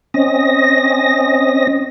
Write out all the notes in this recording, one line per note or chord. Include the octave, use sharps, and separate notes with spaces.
C4 C#4 D#5 A#6